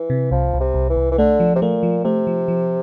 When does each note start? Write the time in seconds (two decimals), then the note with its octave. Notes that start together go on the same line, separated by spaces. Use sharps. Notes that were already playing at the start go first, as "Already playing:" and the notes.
Already playing: E3
0.10 C3
0.31 C2 F3
0.54 C2
0.60 C3
0.74 C2
0.90 E3
0.96 C2
1.11 E3
1.18 D3 A3
1.40 F3
1.56 C3
1.62 A#2 A3
1.83 F3
2.04 C3 A3
2.27 F3
2.48 F3